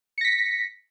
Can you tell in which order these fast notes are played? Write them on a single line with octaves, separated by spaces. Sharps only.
C#7 A#6 B6